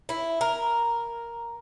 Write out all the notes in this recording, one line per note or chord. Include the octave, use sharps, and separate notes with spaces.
E4
A#4